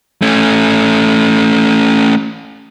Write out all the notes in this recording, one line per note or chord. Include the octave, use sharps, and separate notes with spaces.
A3 C#4